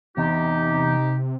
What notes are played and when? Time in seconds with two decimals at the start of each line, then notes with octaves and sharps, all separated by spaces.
0.17 E2 C3 D#4 G4